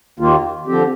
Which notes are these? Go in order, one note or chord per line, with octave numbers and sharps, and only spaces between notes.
D#2 D#3 A#3 F4
D3 F3 C4 G4